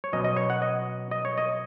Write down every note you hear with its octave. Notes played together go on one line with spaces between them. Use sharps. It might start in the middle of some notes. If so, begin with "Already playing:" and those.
C#5
B2 F#3 C#4 D#5
D#5
C#5
F#5
D#5
D#5
C#5
D#5